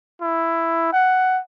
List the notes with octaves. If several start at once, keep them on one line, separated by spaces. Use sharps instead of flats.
E4
F#5